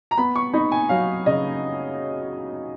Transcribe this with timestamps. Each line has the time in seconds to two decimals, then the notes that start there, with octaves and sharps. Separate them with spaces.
0.11 A#5
0.17 B3 B5
0.36 C#6
0.53 D#4 B5
0.72 G#5
0.89 F#3 F5
1.26 C#3 D#5